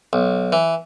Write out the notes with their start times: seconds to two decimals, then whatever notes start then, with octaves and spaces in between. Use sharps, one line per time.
0.13 B1
0.52 E3